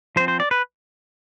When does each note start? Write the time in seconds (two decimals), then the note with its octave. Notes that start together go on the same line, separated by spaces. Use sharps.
0.16 F3 C5
0.20 C4
0.28 C5
0.40 D5
0.51 B4